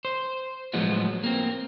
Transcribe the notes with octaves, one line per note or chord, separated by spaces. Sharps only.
C5
A2 F3 F#3 G#3 B3
A#3 C4